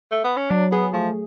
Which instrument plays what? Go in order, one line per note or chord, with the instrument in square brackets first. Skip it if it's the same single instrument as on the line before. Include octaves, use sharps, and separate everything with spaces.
[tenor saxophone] A3
B3
C#4
[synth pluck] F#3 [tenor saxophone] D4
[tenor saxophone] B3 [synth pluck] G#4
[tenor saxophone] F3 [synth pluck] A3